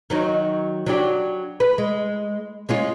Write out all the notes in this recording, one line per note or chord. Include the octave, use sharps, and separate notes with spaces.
D#3 F#3 D#4
F#3 D4 G4
B4
G#3
G#3 C#4 F4